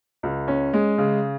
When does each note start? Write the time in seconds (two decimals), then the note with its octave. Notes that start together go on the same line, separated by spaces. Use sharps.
0.23 C#2
0.48 C#4
0.73 G#3
0.98 C#3